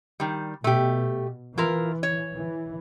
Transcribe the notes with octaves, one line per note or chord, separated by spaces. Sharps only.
D#3 G3
B2 A3 G4
E3 E4 F4 A#4
C#5
E3